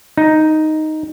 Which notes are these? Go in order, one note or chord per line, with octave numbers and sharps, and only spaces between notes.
D#4